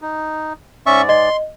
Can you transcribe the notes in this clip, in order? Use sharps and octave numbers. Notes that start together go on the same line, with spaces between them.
D#4
G#2 C#4 D5 E5 C#6
D#5 C6